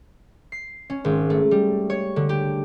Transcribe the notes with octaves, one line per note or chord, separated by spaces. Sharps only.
C7
C#4
G#1
A3
G3
C#5
D3
G4